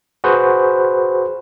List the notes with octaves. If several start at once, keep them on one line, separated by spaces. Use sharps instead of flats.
F#4 G#4 B4 C5